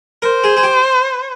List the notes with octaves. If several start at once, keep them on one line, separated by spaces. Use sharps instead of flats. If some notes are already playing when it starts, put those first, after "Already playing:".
A#4 C5
G#4
G#4
G4